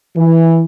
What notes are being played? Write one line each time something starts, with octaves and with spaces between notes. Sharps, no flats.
E3